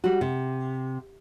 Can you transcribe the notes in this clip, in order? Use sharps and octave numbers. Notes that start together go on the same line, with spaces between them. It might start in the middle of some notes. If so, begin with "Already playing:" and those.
G3 F#4
C3